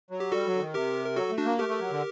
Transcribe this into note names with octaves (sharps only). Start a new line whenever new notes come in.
F#3
G4
G3 F#4 A4
F#3
D3
D#3
C3 G4 A#4
A#4
F#3 F#4 A4
A3
D4 F#4
A#3
A3 G4 A#4
A3
F#3
D3